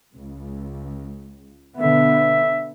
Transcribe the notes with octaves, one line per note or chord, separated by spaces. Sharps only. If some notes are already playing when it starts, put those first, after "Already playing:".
C#2
B2 D3 B3 E5